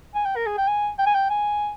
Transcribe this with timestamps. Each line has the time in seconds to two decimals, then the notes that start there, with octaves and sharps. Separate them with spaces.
0.15 G#5
0.26 G5
0.36 A#4
0.46 G#4
0.58 G5
0.68 G#5
0.99 G5
1.06 G#5
1.14 G5
1.30 G#5